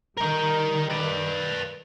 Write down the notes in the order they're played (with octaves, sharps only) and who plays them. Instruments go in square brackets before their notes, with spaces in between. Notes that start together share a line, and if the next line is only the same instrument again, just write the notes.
[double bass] D#3 G3 [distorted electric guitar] A#4 G5
[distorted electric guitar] B4 D5